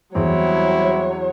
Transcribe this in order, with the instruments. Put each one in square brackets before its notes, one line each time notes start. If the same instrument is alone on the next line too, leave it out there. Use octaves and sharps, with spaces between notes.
[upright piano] E2 [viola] F#3 C#5 [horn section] G3 C4 E4